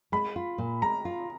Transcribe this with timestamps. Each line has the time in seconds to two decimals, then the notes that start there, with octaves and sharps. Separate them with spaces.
0.12 G#3 B5
0.36 F4
0.58 A#2
0.82 G#3 A#5
1.05 F4